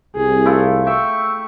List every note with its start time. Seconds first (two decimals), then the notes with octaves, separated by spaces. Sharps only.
0.16 C2 G#4
0.45 A3 E4 F4
0.86 E5 G5 C#6